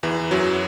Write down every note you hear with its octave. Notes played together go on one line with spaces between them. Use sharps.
E2 E3
F#2 F#3